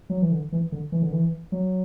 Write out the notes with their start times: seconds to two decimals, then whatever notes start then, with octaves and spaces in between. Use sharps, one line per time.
0.10 F#3
0.22 E3
0.32 D3
0.52 E3
0.72 D3
0.92 E3
1.02 D3
1.12 E3
1.52 F#3